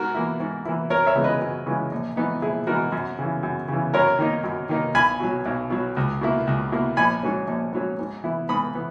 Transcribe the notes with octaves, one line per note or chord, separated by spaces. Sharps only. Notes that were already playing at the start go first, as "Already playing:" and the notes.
Already playing: G#2 F#4 A#4
E3 A#3 E4
G#2
E3 A#3 E4
F#2 A#4 C#5
C#5 E5
C#3 E3 G#3 B3
B4 D#5
F#2
C#3 E3 G#3 B3
A#1
G#2 E3 B3 D#4
A#1 E4 G#4
G#2 E3 B3 D#4 F#4 A#4
F#2
C#3 E3
F#2
C#3 E3
F#2 A#4 C#5
D#3 A#3 D#4
F#2
D#3 A#3 D#4
B1 G#5 B5
B2 F#3
B1
B2 F#3
C#2
B2 A#3 E4
C#2
B2 A#3 E4
A#1 G#5 B5
G#2 F#3 C#4
A#1
G#2 F#3 C#4
G#2
E3 B3 E4
G#2 B5 D#6
E3 B3